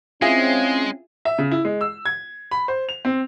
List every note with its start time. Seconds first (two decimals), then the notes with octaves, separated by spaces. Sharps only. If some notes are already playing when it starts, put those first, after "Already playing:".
0.22 G#3 C4 C#4 E4 F4 G#4
1.25 E5
1.38 C#3
1.51 E4
1.65 G#3
1.81 E6
2.06 G#6
2.51 B5
2.68 C5
2.89 F7
3.05 C4